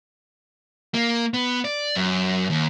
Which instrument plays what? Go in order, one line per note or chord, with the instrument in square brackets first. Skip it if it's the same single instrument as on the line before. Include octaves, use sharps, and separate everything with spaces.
[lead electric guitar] A#3
B3
D5
F#2
D#2